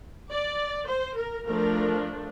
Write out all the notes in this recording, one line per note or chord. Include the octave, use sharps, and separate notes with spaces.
D5
C5
A#4
F3 A3 D4 A#4